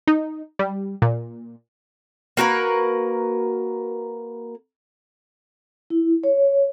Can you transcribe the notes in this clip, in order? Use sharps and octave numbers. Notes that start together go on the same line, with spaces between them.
D#4
G3
A#2
A#3 F#4 A#4 B4
E4
C#5